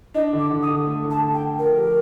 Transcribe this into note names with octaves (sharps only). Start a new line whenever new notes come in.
D4 D#5
D3
D6
D3
D#6
D3
A3
D3
A5
D3
G5
A3
F3 A#4
G4